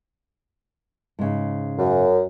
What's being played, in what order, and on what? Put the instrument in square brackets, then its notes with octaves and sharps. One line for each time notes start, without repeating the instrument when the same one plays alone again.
[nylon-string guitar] G#2 C#3
[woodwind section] F#2